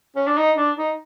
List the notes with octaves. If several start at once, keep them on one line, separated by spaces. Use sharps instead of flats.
C#4
D4
D#4
D4
D#4